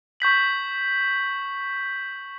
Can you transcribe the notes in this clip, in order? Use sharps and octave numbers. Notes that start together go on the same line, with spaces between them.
C#6 G6 B6 F#7